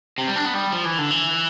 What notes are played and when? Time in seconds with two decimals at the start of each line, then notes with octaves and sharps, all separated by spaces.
0.18 C3
0.28 G3
0.36 D4
0.45 B3
0.54 G3
0.72 F3
0.85 E3
0.98 D3
1.11 E3